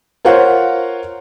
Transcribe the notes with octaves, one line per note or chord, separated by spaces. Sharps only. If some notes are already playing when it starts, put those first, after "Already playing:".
F4 A#4 C5 C#5 F5 F#5